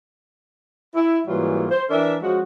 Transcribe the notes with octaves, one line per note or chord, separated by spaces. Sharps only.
E4
G#2 E3 F#3 G3 A#3 F4
C5
E3 D4 A#4 E5
F3 G#3 C#4 F#4